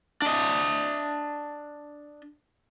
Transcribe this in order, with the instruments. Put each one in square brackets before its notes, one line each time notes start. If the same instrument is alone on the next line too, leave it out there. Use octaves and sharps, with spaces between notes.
[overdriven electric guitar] D4 D#5